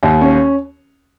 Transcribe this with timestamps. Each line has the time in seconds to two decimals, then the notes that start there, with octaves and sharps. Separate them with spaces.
0.03 D#2
0.21 C#4